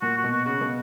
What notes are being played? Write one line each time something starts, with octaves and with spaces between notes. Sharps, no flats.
A#2 F#4
F#4
B2
F#4
C#3 F#4
B2